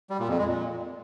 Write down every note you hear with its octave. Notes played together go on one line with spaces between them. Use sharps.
G3
A#2
F2
G#3
A#2